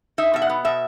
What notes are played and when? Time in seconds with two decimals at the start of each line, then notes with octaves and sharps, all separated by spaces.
0.18 D#4 E5
0.34 B2 E5
0.42 F#5
0.50 B3
0.65 B2 E5